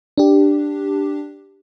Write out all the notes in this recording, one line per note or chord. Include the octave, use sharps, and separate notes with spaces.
D4 G4